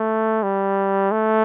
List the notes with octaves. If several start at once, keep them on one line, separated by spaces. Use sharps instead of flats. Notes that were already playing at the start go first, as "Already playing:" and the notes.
Already playing: A3
G3
A3